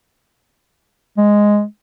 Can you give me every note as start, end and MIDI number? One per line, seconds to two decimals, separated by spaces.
1.18 1.63 56